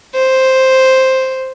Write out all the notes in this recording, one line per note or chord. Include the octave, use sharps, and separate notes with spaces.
C5